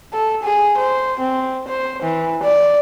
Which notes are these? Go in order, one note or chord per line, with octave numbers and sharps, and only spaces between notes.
A4
G#4
C5
C4
C5
E3
D5